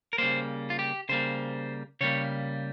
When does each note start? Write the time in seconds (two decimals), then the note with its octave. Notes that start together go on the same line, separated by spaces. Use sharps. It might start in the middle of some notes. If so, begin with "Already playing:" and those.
0.13 A#4
0.18 C#3 G3 A#3 C5
0.70 F4
0.79 G4
1.09 C#3 G3 A#3 C5
2.01 C#3 G3 A#3 C#5